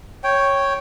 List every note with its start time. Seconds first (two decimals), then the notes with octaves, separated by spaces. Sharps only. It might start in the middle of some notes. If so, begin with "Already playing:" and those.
0.24 C#5 G5